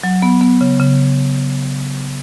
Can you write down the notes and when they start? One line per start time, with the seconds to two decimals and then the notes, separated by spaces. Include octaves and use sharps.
0.03 F#3
0.22 B3
0.41 B3
0.61 C#3
0.79 C#3